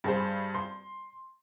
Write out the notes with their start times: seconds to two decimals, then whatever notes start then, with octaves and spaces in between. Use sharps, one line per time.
0.04 G2 G#4 C5
0.54 C6